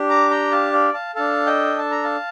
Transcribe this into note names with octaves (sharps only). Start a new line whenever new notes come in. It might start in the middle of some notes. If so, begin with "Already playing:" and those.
Already playing: D4 G4
A#5 D6
G5 A#5
F5 A5
D5 F5
F5 A5
D4 A4 F5 A5
D#5 G5
A5
A#5
F5 A5